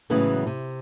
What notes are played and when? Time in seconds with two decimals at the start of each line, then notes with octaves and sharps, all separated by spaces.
0.10 A2 C#3 E3 F#3 G#3 B3
0.47 C3